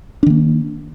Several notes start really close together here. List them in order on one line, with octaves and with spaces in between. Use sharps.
D4 D#3 A#3